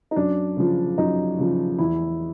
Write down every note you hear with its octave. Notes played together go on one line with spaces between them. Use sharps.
D#4
F#2 D4
C#3 F3
F#2 D#4
C#3 F3
E2 E4